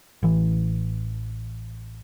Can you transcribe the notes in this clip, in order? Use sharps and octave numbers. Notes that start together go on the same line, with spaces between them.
A1 E3